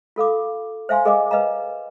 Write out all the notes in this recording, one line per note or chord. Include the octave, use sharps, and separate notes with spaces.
F4 A4 F5 D6
C5 E5 F5 G#5 C6
G#4 A#4 D#5 F5 G#5 D6
B4 D#5 F5 A#5